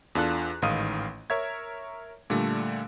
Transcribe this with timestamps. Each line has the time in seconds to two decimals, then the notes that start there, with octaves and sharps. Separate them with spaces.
0.15 E2 D4 F4 A4 F#6
0.62 A1 G#2 D#3 F5 D#6 D#7
1.30 A#4 C#5 E5 G#6
2.30 A#2 D3 G3 A3